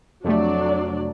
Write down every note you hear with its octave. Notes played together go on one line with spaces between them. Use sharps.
F2 C3 F#3 A3 D4 D5